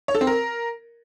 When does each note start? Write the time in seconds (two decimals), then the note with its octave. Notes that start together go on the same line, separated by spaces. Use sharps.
0.08 C#5
0.15 A4
0.21 C4
0.27 A#4